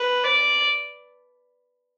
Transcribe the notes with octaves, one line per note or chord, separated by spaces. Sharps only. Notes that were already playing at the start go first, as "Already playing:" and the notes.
Already playing: B4
D5